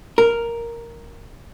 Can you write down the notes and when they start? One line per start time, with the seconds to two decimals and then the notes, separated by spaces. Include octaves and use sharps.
0.18 A#4